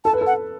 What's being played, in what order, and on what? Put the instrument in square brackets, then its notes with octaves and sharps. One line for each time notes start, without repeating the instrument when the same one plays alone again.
[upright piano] A4 [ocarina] A5
[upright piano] B4
A4
[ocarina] F#5